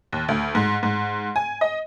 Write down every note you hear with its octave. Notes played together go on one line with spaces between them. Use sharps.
D#2
D2
G#2
G#2
G#5
D#5